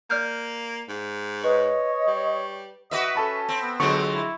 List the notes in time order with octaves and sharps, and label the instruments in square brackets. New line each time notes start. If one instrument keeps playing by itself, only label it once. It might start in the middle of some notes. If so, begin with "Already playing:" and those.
[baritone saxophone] A#3 [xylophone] D5 F6 G6
[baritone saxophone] G#2
[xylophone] B4 [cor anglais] C#5 [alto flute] D#5
[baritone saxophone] G3
[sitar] F#4 B4 E5 [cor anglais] D#5
[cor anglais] C#4 [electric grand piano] A4 A5 B5
[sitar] C4
[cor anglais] B3
[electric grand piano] D3 F#3 [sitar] F3 G#3 C4 [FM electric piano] C#6
[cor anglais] E4